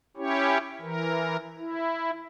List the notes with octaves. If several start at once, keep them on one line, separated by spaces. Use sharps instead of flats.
C#4 E4 G4 C#5
E3 A#4
E4